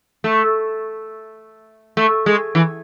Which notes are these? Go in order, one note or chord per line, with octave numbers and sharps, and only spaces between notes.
A3
A3
G#3
E3